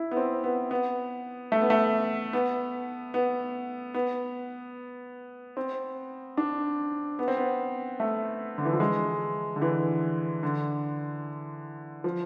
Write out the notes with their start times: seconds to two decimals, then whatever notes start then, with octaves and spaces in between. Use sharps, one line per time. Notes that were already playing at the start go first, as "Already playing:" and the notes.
Already playing: E4
0.11 B3
0.17 C4
0.44 B3
0.71 B3
1.52 A3
1.62 B3
1.70 A3
2.33 B3
3.14 B3
3.94 B3
5.57 C4
6.37 D4
7.19 B3
7.28 C4
7.37 B3
8.00 A3
8.58 D3
8.65 E3
8.73 F3
8.80 G#3
9.56 D3
9.61 E3
10.43 D3
12.04 F3